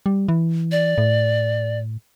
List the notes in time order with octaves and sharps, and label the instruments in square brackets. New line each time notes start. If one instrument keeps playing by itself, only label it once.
[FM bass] G3
E3
[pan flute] D5
[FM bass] A2